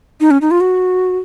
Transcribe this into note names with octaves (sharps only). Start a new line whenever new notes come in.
D#4
C#4
D#4
F4
F#4